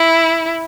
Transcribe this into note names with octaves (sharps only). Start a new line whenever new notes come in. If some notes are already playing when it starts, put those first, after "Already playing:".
Already playing: E4